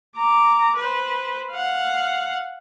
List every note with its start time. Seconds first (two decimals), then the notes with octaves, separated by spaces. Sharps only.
0.17 A#5 D6
0.76 B4 C5
1.51 F5 F#5